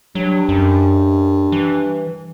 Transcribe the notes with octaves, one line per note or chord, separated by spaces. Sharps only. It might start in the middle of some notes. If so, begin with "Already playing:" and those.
G2 F#3
F#2
E3